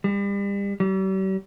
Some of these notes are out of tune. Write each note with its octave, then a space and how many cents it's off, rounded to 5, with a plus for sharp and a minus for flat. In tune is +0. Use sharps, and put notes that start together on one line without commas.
G3 +35
G3 -45